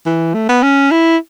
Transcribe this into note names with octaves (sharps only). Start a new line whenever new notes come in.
E3
A3
B3
C#4
E4